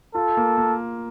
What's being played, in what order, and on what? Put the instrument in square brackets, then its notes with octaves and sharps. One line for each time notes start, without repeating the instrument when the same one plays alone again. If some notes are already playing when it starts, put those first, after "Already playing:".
[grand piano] F4 [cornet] A4
[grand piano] A#3
A#3